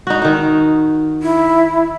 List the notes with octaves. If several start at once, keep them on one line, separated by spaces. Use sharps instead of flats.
D#4 F#4
D#3 D#4
E4